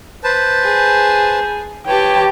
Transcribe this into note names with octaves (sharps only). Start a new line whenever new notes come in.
B4 C5 A5
G#4
G4 B4 C#5 G5 A5